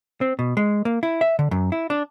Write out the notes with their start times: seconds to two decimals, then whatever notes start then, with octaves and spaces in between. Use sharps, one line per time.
0.21 C4
0.39 B2
0.57 G#3
0.85 A#3
1.03 E4
1.21 E5
1.39 D3
1.51 F#2
1.72 E4
1.90 D4